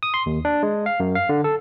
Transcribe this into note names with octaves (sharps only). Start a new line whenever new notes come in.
D#6
C6
D#2
D4
G#3
F5
F#2
F5
D3
A4